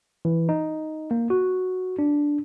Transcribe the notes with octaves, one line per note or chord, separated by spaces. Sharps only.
E3
D#4
A#3
F#4
D4